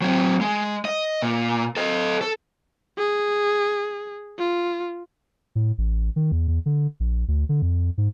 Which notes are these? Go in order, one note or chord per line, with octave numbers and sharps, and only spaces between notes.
F#3 C4
G#3
D#5
A#2
A4 D#5
A4
G#4
F4
A2
A1
D#3
E2
E2
D3
A#1
D2
D3
F2
G#2